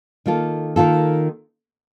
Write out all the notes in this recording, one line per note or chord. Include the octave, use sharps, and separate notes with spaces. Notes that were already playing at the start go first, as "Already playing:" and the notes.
D#3 A#3 F4 A4
D#3 A#3 F4 A4